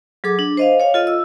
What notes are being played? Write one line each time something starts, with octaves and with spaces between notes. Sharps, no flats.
F#3 G#4 A4 D6
D4
C5 D#5 F5
C#5 F5
F4 A4 D#5
E6